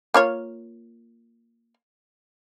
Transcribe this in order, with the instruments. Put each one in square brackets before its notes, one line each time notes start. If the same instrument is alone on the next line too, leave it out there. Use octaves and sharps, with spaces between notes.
[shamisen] A#3 F4 C#5